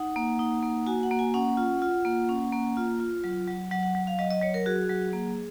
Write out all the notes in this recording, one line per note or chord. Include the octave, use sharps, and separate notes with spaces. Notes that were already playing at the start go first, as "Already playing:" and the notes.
Already playing: D#4 F#5
A#3
D#4
A#3
F#4 G#5
F#5
A#3
G#5
C#4 F#5
F4
F4
A#3
C#4
A#3
F4
F4
F#3
F#3
F#3 F#5
F#5
F#3
F5
F#3 D#5
D#5
F#3 C#5
A#4
F#4 G#4
F#3
A#3